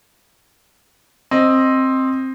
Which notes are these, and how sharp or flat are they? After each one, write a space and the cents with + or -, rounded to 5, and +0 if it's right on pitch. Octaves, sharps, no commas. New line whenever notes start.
C4 +10 D#5 +0